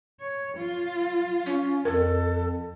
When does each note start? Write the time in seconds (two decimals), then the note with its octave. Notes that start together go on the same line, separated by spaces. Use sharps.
0.20 C#5
0.56 F#3 F4
1.46 C#4
1.85 F2 F3 A4 A#4